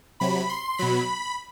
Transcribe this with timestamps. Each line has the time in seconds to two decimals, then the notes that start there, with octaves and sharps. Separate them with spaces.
0.20 C3 F#3 B5
0.49 C6
0.78 B2 F#3 B5